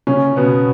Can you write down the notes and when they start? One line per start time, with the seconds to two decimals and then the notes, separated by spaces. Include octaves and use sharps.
0.07 C#3 C#4
0.36 B2 B3